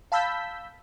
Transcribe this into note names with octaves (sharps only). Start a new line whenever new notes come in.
F5 A5 B5 E6 G6 B6